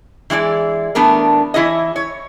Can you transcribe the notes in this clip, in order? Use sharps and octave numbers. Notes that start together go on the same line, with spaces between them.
E3 G#3 E4 D5
E3 A3 B3 D4 A#4
E3 E4 C#5 D#5
C#5